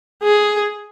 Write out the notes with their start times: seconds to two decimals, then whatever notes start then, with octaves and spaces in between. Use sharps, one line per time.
0.23 G#4